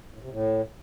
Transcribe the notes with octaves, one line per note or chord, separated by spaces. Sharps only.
A2
C3
A2